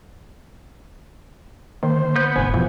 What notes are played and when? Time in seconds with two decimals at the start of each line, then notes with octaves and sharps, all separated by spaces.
1.83 D#3 A#3 C5
1.97 D3
2.16 B3 G6
2.36 F1 G#2 C5 G#5
2.54 E2 B2 E3 F3